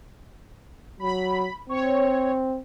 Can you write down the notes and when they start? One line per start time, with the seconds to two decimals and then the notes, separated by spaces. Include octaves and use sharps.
1.00 F#3 B5
1.69 C4 C#5